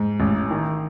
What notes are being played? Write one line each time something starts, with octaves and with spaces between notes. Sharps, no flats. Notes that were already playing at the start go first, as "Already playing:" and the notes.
Already playing: G#2
A1
D#3